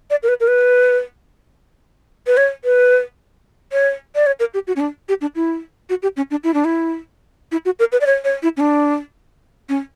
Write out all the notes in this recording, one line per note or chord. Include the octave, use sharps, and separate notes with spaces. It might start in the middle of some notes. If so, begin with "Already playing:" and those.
D5
A#4
B4
A#4
B4
B4
C#5
B4
C#5
D5
C#5
A#4
G4
F#4
C#4
D4
G4
D4
E4
F#4
G4
C#4
D4
E4
D4
E4
E4
F#4
A#4
B4
D5
C#5
C#5
E4
C#4
D4
C#4